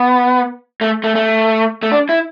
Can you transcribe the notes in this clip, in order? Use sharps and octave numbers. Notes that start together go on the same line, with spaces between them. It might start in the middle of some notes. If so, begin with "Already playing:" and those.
Already playing: B3
A3
A3
A3
A3
D4
E4